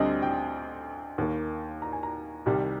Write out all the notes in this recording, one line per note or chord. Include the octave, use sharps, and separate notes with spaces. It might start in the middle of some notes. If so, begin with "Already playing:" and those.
Already playing: D2 D3 G3 C4 D#5
G5
D#2 D#3 A#3
A#5
G#5
A#5
C2 C3 D#3 G3